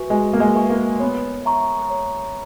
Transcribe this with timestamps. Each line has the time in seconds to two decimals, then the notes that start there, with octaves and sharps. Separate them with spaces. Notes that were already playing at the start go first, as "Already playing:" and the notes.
Already playing: F#4 B4 E5 G#5 C#6
0.10 G#3 F#4
0.33 A#3
0.40 G#3
0.55 B4 E5 G#5 C#6
0.70 A#3
1.00 B3 C#5
1.45 E5 A#5 C#6
1.90 C#5